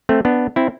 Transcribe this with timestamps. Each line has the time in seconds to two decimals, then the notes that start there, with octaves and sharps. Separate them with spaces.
0.09 A3 C4
0.25 B3 D4
0.56 C4 E4